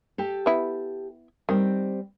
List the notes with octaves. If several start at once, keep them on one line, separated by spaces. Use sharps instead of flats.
G4 A4
B3 E4
D#3 G3 C4